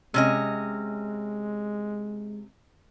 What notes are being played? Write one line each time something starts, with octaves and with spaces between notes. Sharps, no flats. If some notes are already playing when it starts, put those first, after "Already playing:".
C3 G#3 C#4 D#5